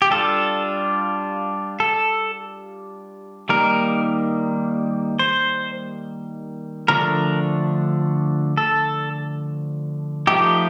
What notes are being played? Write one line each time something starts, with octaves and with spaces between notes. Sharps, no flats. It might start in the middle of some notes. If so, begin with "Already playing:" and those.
G4
G3 D4 F4 A4
A4
D#3 G3 A#3 D#4 A#4
C5
D3 F3 A3 D4 A#4
A4
F3 A3 D#4 G4